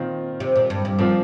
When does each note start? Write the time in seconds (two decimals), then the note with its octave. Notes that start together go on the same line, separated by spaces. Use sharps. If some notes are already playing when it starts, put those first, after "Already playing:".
Already playing: A#2 D#3 C4 F4
0.40 C3
0.56 A#2
0.70 G2
0.85 G2
0.98 A#2 F3 C4 F4